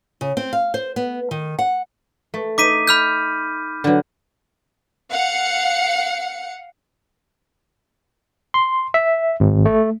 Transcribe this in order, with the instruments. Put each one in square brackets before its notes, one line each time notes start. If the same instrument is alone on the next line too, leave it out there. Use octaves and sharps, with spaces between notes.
[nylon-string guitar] C#3
C4
F5
C5
B3
D#3
F#5
[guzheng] A3
[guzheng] D#4 D#5 [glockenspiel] D6 B6 D#7
[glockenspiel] B5 F6 G6
[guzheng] D3 F#3
[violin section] F5 F#5 C#7
[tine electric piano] C6
E5
G#1
A3